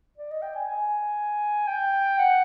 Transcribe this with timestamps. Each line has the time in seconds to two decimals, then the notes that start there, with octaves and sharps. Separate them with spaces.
0.18 D5
0.31 D#5
0.43 G5
0.55 G#5
0.68 G#5
1.67 G5
2.18 F#5